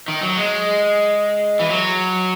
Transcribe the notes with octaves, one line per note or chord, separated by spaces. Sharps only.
D#3
F#3
G#3
E3
F#3